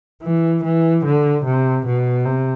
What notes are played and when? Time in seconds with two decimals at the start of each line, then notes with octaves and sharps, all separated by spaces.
0.23 E3
0.64 E3
1.05 D3
1.45 C3
1.86 B2
2.25 C3